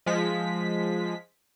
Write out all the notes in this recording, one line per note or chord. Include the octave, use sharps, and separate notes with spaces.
F3 G#3 B6